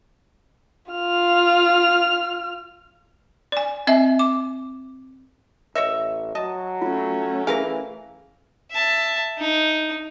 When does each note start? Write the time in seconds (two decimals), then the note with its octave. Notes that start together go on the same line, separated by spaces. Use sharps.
0.91 F4 F6
3.52 D5 G#5
3.87 C4 D#5 E5 G#5
4.19 D6
5.75 A1 C#5 D#5 E5
6.35 F#3 D#5 A5
6.82 A3 C#4 F4
7.47 E3 G#4 A#4 B4 F5 G#5
8.71 E5 A5
9.38 D#4